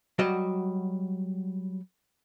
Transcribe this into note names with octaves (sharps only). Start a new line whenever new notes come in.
F#3 G3 F#4 D5 D#5